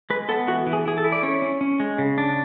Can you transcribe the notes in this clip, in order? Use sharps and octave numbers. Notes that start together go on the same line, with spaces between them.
G#3 B4
B3 A4
E3 F#4
E3
G#4
E4 G#4
A4
E4
D5
C#4 C#5
C#4
C#4
G#3
C#3
D4